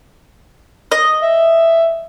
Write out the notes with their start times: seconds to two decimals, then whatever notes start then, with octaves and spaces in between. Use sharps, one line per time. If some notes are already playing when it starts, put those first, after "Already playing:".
0.91 D#5
1.22 E5